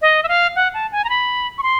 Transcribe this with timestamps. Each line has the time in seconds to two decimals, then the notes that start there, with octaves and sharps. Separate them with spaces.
0.02 D#5
0.23 E5
0.29 F5
0.56 F#5
0.74 A5
0.92 G#5
1.04 A#5
1.09 B5
1.58 C#6
1.63 C6